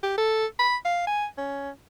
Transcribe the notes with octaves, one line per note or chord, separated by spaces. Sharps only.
G4
A4
B5
F5
G#5
C#4